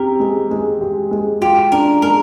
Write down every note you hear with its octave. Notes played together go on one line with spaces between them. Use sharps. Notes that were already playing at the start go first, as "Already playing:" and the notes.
Already playing: C4 G4 A#4
G#3
G#3
G4
G#3
F4 G4
D4 A#4
G#3 A#4